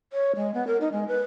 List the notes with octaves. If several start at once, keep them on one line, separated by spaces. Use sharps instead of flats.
C#5
G#3
B3
A#4
D#4
G#3
B4